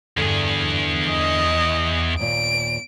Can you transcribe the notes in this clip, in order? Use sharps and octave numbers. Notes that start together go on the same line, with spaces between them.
E2 G2 D3 G#4
D#5
D#2 A#2 D7